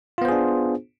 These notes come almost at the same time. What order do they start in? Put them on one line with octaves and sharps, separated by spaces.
F4 B3 C5 G#4 D4